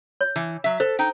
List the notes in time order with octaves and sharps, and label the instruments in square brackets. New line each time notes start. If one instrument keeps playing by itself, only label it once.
[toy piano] C#5
[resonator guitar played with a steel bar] E3
F#3 E5
[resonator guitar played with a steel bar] A4 [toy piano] C5
[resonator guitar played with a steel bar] D#4 G5